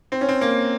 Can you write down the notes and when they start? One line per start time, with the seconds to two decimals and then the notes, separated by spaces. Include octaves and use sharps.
0.12 C4
0.21 C#4
0.29 C4
0.41 A#3